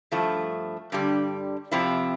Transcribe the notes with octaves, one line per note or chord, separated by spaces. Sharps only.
G2 F3 A3 E4
G2 D3 G3
F2 C3 F3 C4 E4